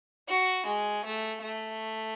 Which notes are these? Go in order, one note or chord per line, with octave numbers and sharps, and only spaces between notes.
F#4
G#3
A3
A3